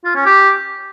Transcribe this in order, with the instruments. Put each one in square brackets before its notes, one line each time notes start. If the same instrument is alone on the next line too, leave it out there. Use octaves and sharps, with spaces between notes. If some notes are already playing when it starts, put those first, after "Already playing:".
[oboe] F4
C#4
G4